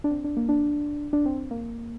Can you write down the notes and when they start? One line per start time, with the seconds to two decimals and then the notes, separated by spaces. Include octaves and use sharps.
0.04 D4
0.11 C4
0.24 D4
0.37 A#3
0.49 D4
1.13 D4
1.26 C4
1.51 A#3